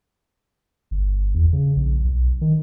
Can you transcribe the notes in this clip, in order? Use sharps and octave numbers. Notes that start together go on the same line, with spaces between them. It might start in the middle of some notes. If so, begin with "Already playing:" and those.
G1
E2
C#3
A#1
B1
D#3